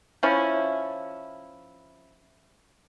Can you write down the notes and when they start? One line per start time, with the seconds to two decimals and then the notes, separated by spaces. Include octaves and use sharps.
0.23 F3 C#4 E4